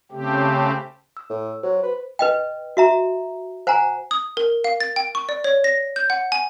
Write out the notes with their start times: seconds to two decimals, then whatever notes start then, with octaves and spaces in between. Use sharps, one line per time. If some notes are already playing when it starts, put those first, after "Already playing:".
0.12 C#3 A3 C4 G4
1.17 E6
1.30 A2
1.63 F#3 C5
1.84 B4
2.19 B4 D#5 G5
2.77 F#4 E5 A#5
3.67 C5 F#5 G#5 A#5
4.11 D#6
4.37 A#4
4.64 F5
4.80 A6
4.96 G5
5.15 C#6
5.29 D5
5.44 C#5
5.64 A#6
5.96 G6
6.10 F#5
6.32 G#5